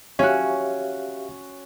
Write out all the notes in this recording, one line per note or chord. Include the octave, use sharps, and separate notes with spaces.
C#4 F#4 G4 E5 F5